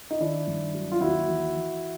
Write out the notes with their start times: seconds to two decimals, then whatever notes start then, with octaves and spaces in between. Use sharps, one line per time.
0.11 D#4
0.20 D#3 D4 E4
0.47 G2
0.74 F#3
0.92 F4
1.01 D#2 E4 F#4
1.28 E3
1.55 E3